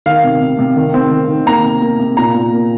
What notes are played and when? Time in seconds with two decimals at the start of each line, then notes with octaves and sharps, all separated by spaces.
0.06 D#3 F5
0.24 C3
0.41 C3
0.59 C3
0.76 D#3
0.94 C4
1.11 D#3
1.29 D#3
1.46 A#3 A#5
1.64 C3
1.82 A#3
1.99 C3
2.17 A#2 A#5
2.35 A#2
2.52 A#3